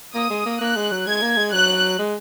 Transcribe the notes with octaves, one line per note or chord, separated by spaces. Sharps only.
A#3 D#6
G#3
A#3
A#3 F#6
G#3
F#3
G#3 G#6
A#3
G#3
F#3 F#6
G#3